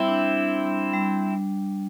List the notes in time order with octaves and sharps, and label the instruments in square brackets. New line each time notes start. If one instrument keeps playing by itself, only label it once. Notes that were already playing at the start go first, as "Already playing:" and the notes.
Already playing: [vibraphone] G3 [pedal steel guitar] C4 E4
[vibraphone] D4
D4
G3
G3